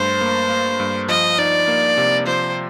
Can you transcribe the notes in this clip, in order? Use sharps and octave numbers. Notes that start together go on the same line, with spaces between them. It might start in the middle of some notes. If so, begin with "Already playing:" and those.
Already playing: G2 A3 C5
A#3
A#3
G2
F3 D#5
D#4 D5
A#3
C3
F3 C5